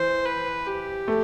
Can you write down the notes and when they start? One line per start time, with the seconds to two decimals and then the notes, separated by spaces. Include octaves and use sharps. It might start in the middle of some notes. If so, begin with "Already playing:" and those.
Already playing: E3 C5
0.26 B4
0.66 G4
1.08 A3